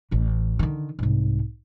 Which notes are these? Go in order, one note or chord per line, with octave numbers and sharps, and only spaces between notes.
A1 E3
D3 D#3
C2 G#2